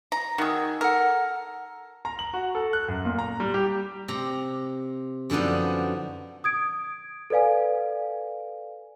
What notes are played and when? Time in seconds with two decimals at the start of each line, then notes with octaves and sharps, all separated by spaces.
0.12 A#5
0.38 D#3 F#4 G#4 C#6 E6
0.81 A4 A#4 F#5
2.05 A#5
2.19 F#7
2.33 F#4
2.55 A4
2.73 F#6
2.88 F#2
3.05 A#2
3.18 A#5
3.40 G3
3.54 G4
4.08 C3 A#5
5.30 F#2 D3 F3 B3 D#4
6.44 D#6 G#6 D7
7.30 A4 B4 D5 F5 G#5